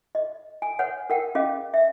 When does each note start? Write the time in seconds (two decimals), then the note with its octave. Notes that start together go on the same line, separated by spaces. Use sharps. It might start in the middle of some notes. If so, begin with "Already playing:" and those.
0.15 D#5
0.62 G#5
0.79 B4 C#5 F#5
1.10 A#4 F#5 G5
1.35 C#4 G#4 D#5 F5
1.74 E5